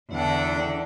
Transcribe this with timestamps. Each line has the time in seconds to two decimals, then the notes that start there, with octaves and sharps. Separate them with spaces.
0.12 E2 D3 D4 F#5 G5 A5